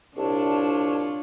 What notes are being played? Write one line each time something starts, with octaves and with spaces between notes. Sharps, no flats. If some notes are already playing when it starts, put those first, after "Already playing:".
C2 D4 F4 C#5 A5